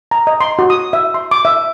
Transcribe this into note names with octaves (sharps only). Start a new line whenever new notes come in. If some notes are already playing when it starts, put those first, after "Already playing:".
A#5
D#5
C6
F#4
D#6
E5
C6
D6
E5